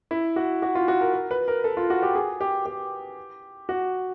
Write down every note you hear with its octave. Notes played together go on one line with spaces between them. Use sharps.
E4
F#4
F#4
F4
F#4
A#4
A#4
B4
A#4
A4
F4
F#4
G4
G#4
G4
G4
F#4